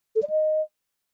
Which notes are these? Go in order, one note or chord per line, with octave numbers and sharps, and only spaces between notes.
A4
D5
D#5